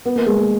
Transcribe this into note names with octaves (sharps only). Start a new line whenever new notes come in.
B3
A#3
G#3
A#3